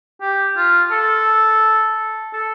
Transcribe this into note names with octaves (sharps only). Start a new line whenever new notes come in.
G4
F4
A4
A4